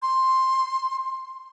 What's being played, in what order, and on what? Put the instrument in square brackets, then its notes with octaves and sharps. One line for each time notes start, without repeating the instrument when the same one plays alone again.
[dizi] C6